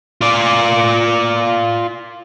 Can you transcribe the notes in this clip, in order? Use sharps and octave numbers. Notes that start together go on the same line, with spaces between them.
F4 D5